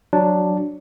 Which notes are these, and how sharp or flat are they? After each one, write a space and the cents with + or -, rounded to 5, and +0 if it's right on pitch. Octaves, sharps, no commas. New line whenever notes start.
F#3 +0 D4 +0